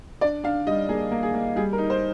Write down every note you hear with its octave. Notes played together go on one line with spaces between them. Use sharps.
D4 D5
D4 F5
G3 D#5
A#3 G#4
A#3
G#4
A#3
G3 G#4
A#4
D#4
C5